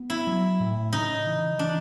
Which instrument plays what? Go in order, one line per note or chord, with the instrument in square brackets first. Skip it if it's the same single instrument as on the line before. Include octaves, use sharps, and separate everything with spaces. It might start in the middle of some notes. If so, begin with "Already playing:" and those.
Already playing: [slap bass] B3
[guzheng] E4
[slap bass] F#3
A2
[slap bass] C#3 [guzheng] D#4
[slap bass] E3
[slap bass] E3 [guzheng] D4